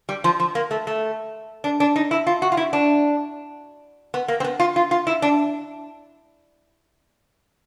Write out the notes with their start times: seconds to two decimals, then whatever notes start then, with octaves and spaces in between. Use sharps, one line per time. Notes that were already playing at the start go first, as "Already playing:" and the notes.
0.09 G3
0.24 F3
0.40 F3
0.55 A#3
0.71 A3
0.87 A3
1.64 D4
1.80 D4
1.96 D#4
2.11 E4
2.27 F4
2.42 F#4
2.52 F4
2.57 E4
2.73 D4
4.14 B3
4.28 A#3
4.40 C4
4.44 B3
4.60 F4
4.76 F4
4.91 F4
5.07 E4
5.22 D4